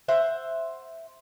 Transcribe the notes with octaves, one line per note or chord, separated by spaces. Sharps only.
C5 E5 F#5